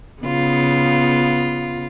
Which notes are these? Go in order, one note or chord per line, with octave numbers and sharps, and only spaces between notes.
C#3 B3 F4